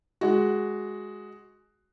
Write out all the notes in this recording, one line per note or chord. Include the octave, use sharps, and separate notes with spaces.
G#3 F#4